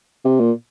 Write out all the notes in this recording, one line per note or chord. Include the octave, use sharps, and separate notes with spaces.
C3
A#2